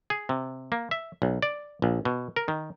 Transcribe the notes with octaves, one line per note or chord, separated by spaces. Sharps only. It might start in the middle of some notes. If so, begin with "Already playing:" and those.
G#4
C3
A#3
E5
B1
D5
A#1
B2
A#4
D#3